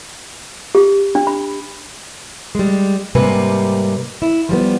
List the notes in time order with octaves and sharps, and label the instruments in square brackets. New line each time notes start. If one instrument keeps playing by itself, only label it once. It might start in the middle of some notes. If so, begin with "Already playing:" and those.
[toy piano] G4
D4
B5
[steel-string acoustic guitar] G3 G#3
G#2 C3 G3 A#3 B4 G#5
E4
F3 G3 B3